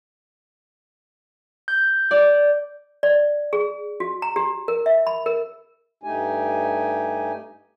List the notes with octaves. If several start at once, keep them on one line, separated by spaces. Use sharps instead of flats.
G6
D5
D5
G#4
F#4
A#5
G4
A#4
E5
B5
A#4
G2 A3 D#4 G4 G#5